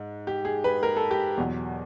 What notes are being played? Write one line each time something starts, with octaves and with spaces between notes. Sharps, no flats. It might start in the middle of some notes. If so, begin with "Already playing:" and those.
Already playing: G#2
G4
G#4
B4
A#4
A4
G4
E2 B2 F#3